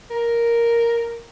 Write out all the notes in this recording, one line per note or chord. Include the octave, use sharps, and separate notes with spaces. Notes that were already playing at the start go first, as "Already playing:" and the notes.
A#4